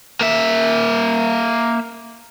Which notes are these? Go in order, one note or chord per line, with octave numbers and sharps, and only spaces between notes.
A#3 E5